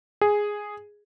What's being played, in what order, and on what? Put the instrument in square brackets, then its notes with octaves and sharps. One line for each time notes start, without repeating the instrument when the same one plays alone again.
[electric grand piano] G#4